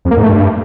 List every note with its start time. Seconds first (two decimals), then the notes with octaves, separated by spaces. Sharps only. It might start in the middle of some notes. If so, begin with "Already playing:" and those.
0.05 F2
0.11 A#3
0.17 G#2
0.23 A3
0.29 G2